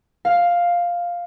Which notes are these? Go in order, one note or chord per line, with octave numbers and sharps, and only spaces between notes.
F5